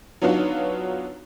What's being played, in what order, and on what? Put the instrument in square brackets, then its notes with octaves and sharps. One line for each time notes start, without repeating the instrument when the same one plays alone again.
[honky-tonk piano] F#3 B3 D4 D#4 F4 F#4